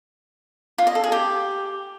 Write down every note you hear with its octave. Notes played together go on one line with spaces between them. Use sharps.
F4
D#5
A4
G#4
G4